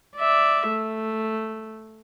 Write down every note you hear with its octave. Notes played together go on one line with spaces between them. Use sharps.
D5 E5
A3